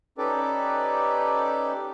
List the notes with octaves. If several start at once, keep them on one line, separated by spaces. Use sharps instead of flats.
C#4 D#4 G4 A4 B4 D5